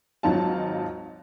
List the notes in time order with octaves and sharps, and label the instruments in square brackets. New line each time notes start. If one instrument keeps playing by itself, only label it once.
[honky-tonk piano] G#1 F#3 D#4 F4 A5